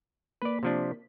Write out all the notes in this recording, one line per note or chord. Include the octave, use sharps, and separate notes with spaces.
A#3 B4 D5 B6
C3 F3 D4